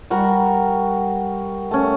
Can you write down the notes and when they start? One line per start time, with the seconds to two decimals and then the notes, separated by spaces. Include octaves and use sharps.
0.10 G3 F#4 A#4 F#5
1.71 A3 C#4